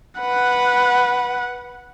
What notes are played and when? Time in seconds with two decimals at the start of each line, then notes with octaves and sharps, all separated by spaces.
0.21 B4 F#5